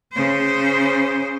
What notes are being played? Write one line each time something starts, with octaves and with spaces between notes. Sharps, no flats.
C#3 C5